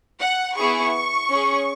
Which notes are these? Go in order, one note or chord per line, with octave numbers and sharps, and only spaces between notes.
F#5
B3 E4 G#4 C#6
C#4 G#4